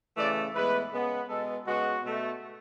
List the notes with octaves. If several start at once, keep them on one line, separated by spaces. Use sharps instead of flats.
C#3 E3 A3 D5
A2 E3 G#3 B3 B4
C#3 G#3 B3
B2 G#3 B3 A4
C#3 G#3 B3 F#4
B2 A3